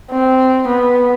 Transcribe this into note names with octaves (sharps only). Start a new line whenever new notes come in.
C4
B3